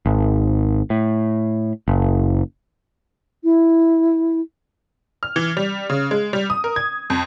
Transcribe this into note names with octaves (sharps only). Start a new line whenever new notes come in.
G#1
A2
F#1
E4
F6
E3
G3
C#3
G#3
G3
D#6
A#4
G#6
F2